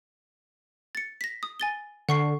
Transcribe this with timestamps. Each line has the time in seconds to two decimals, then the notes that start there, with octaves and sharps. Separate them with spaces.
0.95 A6 C#7
1.21 A#6 B6
1.43 D#6
1.60 G#5 A6 G7
2.09 D3 F#5 C#6 C7